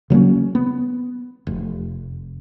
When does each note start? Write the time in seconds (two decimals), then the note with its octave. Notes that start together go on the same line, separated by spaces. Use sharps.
0.10 C#3 F#3 A#3 C#4
0.55 B3
1.47 F1